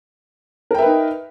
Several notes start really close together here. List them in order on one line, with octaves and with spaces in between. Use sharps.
A#4 G5 E5 B4 D#4